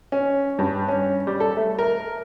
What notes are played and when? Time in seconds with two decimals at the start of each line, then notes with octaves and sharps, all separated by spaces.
0.12 C#4
0.59 G2
0.88 C#4
1.27 G3
1.40 A4
1.57 A3
1.79 A#4